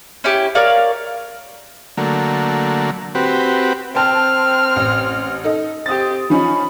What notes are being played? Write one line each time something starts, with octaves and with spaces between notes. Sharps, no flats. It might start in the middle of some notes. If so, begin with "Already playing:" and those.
C#4 E4 G4
A#4 C#5 D5 F5
D3 F#3 A3 A#3
C4 F#4 G4 B4
C4 C5 G5 A5 F6
A1
D#4 A4 D#5
C4 G4 D#6 A6
F3 C#4 D#4 B5